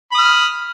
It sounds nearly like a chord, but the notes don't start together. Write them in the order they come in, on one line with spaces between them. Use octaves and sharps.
B5 D#6 F6